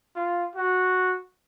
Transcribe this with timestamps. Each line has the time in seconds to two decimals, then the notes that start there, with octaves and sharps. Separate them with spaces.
0.15 F4
0.55 F#4